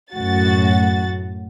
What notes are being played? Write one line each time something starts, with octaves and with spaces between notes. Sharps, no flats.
F#2 A2 F#4 A6